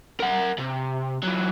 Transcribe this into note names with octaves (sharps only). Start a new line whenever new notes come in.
A#4 F#5
C3
E3 F#3